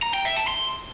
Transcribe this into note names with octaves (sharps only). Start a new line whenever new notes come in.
A#5
G5
E5
A5
C6